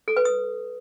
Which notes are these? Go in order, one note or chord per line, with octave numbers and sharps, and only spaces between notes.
A4
B4
D#6